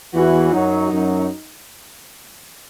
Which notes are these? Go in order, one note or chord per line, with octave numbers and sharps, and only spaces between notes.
E2 E3 F#4
F#2 F#3 D#4
F#2 F#3